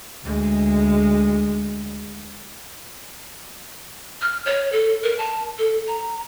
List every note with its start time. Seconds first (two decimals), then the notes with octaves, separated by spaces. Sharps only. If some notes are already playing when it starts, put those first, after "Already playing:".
0.24 D2 G#3
4.22 F6
4.46 C#5
4.72 A4
5.03 A#4
5.18 A5
5.58 A4
5.88 A#5